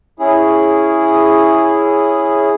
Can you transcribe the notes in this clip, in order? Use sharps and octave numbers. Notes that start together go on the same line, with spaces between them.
C#4 E4 G#4